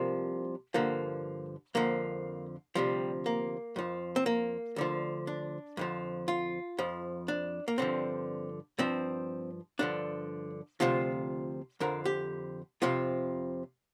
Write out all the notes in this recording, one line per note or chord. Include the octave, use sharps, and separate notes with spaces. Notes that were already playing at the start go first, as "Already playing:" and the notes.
Already playing: C2 C3 F3 A#3
G2 D3 F3 A#3
F2 D3 F3 A#3
D2 C3 F3 G3
A#3
F2 F3
C4
A#3
D2 D3 F3
D4
F2 D3 F3
F4
F2 F3
D4
A#3
G2 D3 F3 C4
G2 F3 C4
G2 D3 F3 D4
D2 C3 F3 F4
F2 D3 F3 A#4
G4
F2 C3 F3 F4